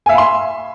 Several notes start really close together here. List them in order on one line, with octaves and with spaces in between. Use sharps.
G#5 E5 F5 B5 C6